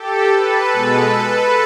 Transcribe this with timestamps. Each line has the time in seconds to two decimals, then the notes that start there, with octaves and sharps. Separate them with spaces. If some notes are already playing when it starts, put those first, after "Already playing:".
Already playing: G4 A4
0.31 A4 B4
0.72 B2 G#3